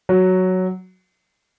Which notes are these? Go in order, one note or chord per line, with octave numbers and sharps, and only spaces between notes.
F#3